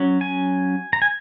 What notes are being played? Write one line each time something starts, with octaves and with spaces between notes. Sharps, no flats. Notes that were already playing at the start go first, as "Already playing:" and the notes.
Already playing: F#3 C#4
G#5
A#5
G#5